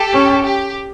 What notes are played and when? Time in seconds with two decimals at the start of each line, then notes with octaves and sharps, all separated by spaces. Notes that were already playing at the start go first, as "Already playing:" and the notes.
Already playing: G4 A4
0.13 C#4
0.44 G4